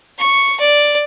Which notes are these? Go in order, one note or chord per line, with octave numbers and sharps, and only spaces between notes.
C#6
D5